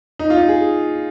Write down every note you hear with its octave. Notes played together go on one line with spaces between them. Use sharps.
D#4
F4
D#4
G#4